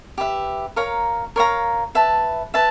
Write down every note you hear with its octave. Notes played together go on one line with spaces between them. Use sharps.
G4 B4 E5
A#4 C#5 F5 A#5
A#4 C#5 F5 A#5
B4 E5 A5
B4 E5 A5